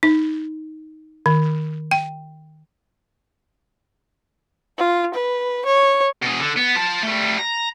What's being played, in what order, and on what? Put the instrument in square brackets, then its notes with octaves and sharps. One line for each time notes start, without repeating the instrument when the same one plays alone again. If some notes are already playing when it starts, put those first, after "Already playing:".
[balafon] D#4
D#3
G5
[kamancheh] F4
B4
C#5
[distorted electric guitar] B2 G#4
D3
B3
F4 A5
G3 A3
A#5